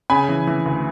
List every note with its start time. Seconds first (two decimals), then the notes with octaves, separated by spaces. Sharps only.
0.10 C#3 G#5 B5
0.29 E3
0.47 E3
0.66 D2